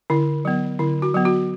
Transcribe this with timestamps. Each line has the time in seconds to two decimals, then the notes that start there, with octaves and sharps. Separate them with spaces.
0.10 D3 E4
0.45 F#3 B3
0.79 D3 E4
1.02 F#4
1.14 F#3 B3
1.25 F#4